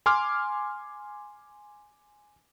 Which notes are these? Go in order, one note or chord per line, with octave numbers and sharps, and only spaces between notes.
G#5 C6 D6 F6